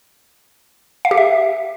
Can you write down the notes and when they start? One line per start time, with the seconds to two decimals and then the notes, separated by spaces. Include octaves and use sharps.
1.05 F5
1.11 G4
1.17 E5